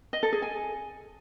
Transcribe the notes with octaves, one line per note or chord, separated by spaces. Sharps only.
D#5
A4
G#4
G#5